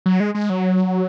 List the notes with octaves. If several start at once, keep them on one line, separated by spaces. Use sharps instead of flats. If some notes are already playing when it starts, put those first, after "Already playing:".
F#3
G#3
G#3
F#3